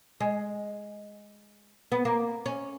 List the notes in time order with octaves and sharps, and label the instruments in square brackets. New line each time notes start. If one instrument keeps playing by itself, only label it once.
[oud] G#3
B3
A#3
C#4